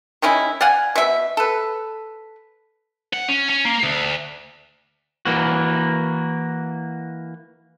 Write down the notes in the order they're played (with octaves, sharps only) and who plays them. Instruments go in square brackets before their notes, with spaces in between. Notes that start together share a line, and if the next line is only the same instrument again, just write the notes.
[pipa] D#3 G#3 C#4 E4
D5 F5 F#5 G#5
B2 E5
A4 B4
[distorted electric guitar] F#5
C#4
C#4
A#3
D2
[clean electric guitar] E3 A#3 F#4